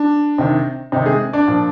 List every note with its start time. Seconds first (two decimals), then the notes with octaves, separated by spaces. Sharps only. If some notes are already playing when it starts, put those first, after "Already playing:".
Already playing: D4
0.38 C3 D#3
0.92 C3 D#3 D#4
1.06 G#3 G#4
1.33 D4 D5
1.48 A#2 F3